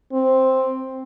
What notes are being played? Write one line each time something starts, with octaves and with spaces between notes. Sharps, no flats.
C4